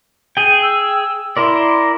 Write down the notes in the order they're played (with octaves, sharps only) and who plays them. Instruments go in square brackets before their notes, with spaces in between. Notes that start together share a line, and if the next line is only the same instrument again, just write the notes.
[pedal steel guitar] G#4 G5 [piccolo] D#7
[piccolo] E6
[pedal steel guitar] E4 A#4 D5 [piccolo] C6